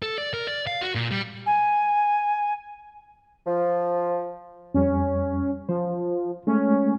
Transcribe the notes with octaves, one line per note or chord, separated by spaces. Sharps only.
A4
D5
A#4
D5
F5
F#4
A#2
G3
G#5
F3
F2 G3 C#4
F3 C5
G#3 A3 C#4